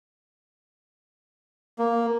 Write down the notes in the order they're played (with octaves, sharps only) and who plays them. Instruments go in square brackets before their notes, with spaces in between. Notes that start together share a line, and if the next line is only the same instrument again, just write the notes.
[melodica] A#3